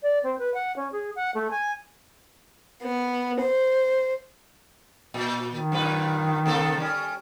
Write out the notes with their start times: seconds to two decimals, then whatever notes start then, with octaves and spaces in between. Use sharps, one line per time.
0.03 D5
0.23 C4
0.39 B4
0.54 F#5
0.76 C#4
0.92 G#4
1.16 F#5
1.35 A3
1.51 G#5
2.82 B3
3.41 C5
5.14 A#2
5.54 D#3
5.72 F#2 A#2 B4
6.46 C3 A#3 A4
6.77 G3 C#4